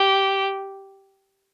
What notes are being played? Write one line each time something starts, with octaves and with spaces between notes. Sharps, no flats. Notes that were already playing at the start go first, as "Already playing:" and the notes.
Already playing: G4